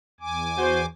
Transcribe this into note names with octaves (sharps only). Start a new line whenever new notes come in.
E2 G#5 D6
F#4 C5